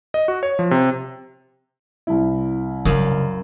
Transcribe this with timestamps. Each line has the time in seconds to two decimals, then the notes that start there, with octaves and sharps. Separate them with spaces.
0.14 D#5
0.28 F#4
0.43 C#5
0.59 F3
0.71 C3
2.07 C2 E4
2.85 F#2 C#3 F5 B5